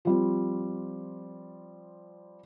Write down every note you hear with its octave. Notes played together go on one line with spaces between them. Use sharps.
F3 G3 C4